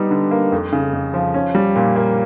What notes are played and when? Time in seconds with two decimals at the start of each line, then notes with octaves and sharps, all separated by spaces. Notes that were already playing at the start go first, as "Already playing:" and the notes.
Already playing: G3 B3 D#4
0.11 D3
0.31 A#3
0.52 F2
0.72 C#3
0.93 F2
1.14 F3
1.34 C#4
1.55 G3
1.75 A#2
1.96 A#3